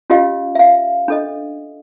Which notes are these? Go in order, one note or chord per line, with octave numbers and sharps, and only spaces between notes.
C#4 F4 G4 D#5 F5
E5 F5
D4 A4 D#5